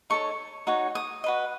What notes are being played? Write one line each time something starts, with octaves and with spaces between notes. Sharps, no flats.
D#4 A4 C#5 C#6
D#4 F#4 C#5
D#6
F#4 B4 D#5